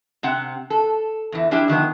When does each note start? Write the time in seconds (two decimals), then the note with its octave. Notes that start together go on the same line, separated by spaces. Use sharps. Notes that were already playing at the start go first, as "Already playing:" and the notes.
0.23 C3 C4 F#5
0.70 A4
1.32 E2 E3
1.51 F3 G3 D4 E4 G4
1.68 D3 D#3 F3 B3